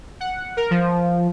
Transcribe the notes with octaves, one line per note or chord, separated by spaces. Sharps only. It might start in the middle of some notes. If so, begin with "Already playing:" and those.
F#5
A#4
F3